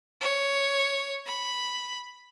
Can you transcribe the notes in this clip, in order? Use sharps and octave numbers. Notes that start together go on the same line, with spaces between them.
C#5
B5